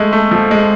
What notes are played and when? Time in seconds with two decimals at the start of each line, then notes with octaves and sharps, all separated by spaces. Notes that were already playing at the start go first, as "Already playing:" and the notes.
Already playing: G#3 A3
0.13 A3
0.31 F3
0.51 G#3